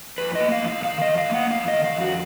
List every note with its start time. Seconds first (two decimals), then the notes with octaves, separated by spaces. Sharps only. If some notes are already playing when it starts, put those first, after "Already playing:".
0.18 F2 B4
0.35 D#5
0.40 A#3
0.52 F5
0.62 F2
0.68 F5
0.85 D#3 F5
1.02 D#5
1.07 F2
1.18 F5
1.29 A#3
1.34 F#5
1.50 F2 F5
1.68 D#3 D#5
1.84 F5
1.95 F2
2.01 F#4